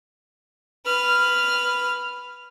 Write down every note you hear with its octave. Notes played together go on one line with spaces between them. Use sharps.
B4 F6